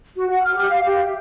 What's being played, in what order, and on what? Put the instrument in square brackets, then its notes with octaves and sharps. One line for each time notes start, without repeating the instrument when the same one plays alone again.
[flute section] F#4
F#5
F6
G4
F5
G4
E5